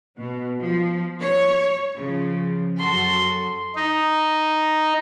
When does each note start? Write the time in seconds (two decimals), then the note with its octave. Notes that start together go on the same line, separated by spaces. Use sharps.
0.17 B2
0.61 F3
1.19 C#5
1.98 C#3 F3
2.79 F#2 F#4 A4 C6
3.75 D#4